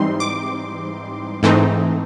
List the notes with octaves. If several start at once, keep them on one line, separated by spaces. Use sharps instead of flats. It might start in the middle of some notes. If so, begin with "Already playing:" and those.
Already playing: G#2 E3 G3 C4 D#4 C6
D6
G#2 E3 A3 C4 D#4